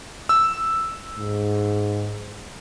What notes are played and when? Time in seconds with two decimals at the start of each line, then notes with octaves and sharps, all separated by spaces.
0.29 E6
1.18 G#2